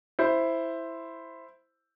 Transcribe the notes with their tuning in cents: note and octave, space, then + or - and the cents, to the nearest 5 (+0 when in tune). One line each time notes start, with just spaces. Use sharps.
E4 +5 C5 +0